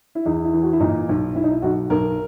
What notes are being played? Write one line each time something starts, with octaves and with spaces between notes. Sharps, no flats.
E4
E2 D#4
E4
E3
F#4
E4
A#2 D#4
B1
B1 E4
D#4
E4
B1 F#4
B1 A#4